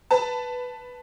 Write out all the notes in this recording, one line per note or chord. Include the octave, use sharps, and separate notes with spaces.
B4 A5